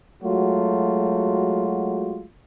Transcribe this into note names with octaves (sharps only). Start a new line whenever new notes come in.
F#3 G#3 A3 F4 F#4